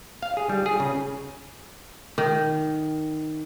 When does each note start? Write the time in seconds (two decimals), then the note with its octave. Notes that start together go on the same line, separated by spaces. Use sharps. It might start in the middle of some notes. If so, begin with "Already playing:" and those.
0.23 F5
0.37 G#4
0.49 G3
0.66 G#4
0.80 C#3
2.18 D#3